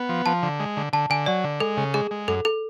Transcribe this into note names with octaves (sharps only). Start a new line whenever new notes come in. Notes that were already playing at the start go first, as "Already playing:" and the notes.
Already playing: B3
F3
F3 A5
D3
G#3
D3
D3 A5
D3 G#5
F#3 D5
D3
G#3 A4
C#3
G#3 G#4
G#3
F#2 A4
A4